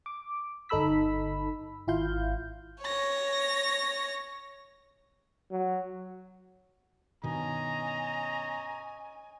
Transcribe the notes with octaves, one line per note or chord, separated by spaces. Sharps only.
D6
G1 D#4 A4 B5 E6 B6
G#1 E4 F4 F5 G6
C#5 A#6
F#3
G2 B2 D#3 C#4 D#5 G#5 A#5